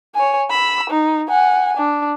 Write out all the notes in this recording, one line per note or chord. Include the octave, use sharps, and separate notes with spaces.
C#5 G#5
B5 E6
D#4
F#5 G#5
D4